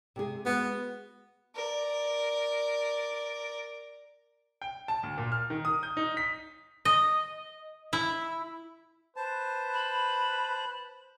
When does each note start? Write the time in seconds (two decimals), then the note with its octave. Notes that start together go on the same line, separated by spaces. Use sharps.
0.16 C3 G#3 G#4
0.46 G#3 B3 F#4
1.55 A#4 D5
4.62 G5
4.88 A5
5.03 D2
5.18 A#2
5.32 F6
5.50 D#3
5.65 D#6
5.83 G6
5.97 D#4
6.17 B6
6.85 D#5
7.93 E4
9.16 B4 C5 A5
9.74 B5